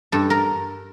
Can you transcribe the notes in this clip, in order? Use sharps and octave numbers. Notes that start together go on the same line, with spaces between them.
G2 A4
A#4